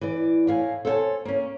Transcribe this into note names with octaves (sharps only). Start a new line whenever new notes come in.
E3 D5
A2 F5 G#5
A4 C5 C#5 F#5 G#5 A5
A#3 C#4